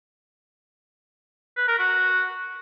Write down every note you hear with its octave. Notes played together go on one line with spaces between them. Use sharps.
B4
A#4
F#4